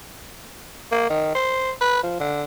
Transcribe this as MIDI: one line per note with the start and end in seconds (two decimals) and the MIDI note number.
0.92 1.08 58
1.10 1.31 51
1.35 1.71 72
1.81 2.03 71
2.03 2.15 53
2.20 2.44 50